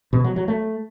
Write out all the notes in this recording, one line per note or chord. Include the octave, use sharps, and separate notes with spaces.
B2
F#3
F#3
A3